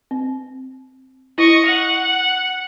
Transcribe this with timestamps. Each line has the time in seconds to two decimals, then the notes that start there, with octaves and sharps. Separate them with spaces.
0.11 C4
1.38 E4 D#5 C#6
1.66 F#5